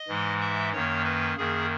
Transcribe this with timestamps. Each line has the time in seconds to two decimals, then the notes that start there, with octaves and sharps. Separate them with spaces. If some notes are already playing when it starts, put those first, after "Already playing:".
Already playing: D#5
0.08 G#2 E3 G#3
0.40 E5
0.73 F#2 D#3 A#3 C#5
1.05 B4
1.37 F#2 D#3 A#3 G#4